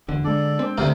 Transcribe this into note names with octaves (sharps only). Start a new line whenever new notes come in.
E1 D3
G#3 D4 A4 D5
C4
D2 C3 A#4 F5